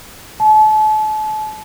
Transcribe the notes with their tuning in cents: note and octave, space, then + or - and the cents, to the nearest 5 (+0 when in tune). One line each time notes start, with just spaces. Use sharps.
A5 -35